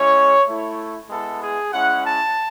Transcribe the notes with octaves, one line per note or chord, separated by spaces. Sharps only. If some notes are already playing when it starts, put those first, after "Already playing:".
Already playing: G#3 C#4 E4 C#5
A3 E4
G#3 B3 E4 A4
G#4
G#3 C#4 E4 F#5
A5